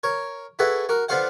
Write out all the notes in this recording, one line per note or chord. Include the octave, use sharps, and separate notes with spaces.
A#4 C#5
E4 F#4 G#4 A4 B4 E5
F#4 A#4
D3 B3 F4 C5 F5 F#5